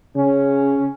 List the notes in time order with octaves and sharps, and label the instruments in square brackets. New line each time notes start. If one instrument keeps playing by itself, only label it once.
[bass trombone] C#3 [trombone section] C#4